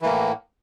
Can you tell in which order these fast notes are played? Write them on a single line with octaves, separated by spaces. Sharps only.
E3 A#3 A2